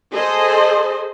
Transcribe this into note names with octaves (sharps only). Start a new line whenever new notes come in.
G#4 A4 C5 D#5